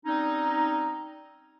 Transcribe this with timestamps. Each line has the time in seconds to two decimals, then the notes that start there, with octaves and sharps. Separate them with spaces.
0.06 G3 C4 C#4 D#4